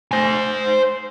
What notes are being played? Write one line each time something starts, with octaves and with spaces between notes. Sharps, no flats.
C5 G#5